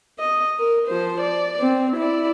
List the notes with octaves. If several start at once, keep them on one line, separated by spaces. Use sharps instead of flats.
D#5
A#4
F3 C5
D5
C4
E4 D5